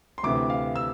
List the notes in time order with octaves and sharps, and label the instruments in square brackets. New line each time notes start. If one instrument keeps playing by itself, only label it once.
[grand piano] C6
D2 C3 E3 D6
F5
E6